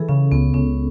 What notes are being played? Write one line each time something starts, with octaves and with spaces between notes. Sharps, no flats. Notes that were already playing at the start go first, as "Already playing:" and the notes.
Already playing: E3 G#4 A4
C#3 C#4
C#2 B3
C#2 C#4